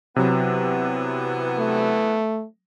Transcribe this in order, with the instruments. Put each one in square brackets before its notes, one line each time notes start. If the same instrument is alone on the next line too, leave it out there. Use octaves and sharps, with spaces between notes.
[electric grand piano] C3 F#3 [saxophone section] E3 B3
[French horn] A3